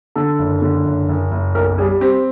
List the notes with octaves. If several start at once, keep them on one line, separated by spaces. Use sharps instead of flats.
D3 A4
F#1
D3
F#1
F#1
F#1
B1 A#4
G3 G#4
C4 G4